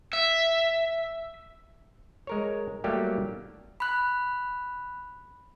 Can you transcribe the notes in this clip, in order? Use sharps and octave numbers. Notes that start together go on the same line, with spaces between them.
E5
G#3 A#4 C#5
F#3 G3 A3 A#3 G4
B5 F#6